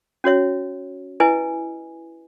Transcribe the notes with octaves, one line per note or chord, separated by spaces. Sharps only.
C#4 F#4 C#5 E5
E4 B4 D#5 G#5